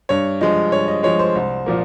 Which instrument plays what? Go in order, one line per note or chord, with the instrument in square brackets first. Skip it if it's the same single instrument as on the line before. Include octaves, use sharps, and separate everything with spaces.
[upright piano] G2 C#5
F3 G#3 D#5
G2 C#5
D#5
F3 G#3 C#5
C5
C2
A#2 F3 A#3